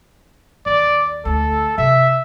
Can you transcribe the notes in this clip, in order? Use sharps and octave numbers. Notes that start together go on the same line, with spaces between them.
D#2 D5
D2 E4 A4
C3 E5